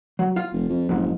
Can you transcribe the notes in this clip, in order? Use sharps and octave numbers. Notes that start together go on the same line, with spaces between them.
F#3
F4 F5
F1
F2
F#1 F2 G#2